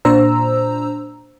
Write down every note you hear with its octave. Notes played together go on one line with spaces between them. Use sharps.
A#2 D4 C5 A#5 E6